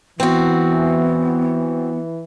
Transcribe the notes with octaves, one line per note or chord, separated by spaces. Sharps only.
E3 B3 C4 F#4